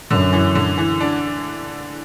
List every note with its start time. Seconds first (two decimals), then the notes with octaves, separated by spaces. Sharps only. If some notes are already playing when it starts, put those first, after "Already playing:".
0.11 F#2 D3
0.33 E3
0.55 D3
0.78 E3
1.00 D4